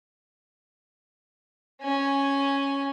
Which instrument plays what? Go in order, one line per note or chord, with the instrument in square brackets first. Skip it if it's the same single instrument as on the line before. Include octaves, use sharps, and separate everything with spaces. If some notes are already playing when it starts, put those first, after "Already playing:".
[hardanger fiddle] C#4 G#5